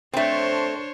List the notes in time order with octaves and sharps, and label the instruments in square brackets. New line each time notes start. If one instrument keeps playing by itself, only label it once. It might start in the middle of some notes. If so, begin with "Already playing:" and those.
[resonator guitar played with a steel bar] A3 C4 [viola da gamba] D4 C5 C#5